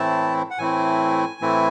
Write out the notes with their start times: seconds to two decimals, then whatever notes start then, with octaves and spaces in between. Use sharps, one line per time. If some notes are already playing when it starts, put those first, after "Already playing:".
Already playing: A2 E3 A3 C4 E4 A5
0.50 F#5
0.59 A2 E3 A3 C4 E4 G#5
1.41 A2 E3 A3 C4 E4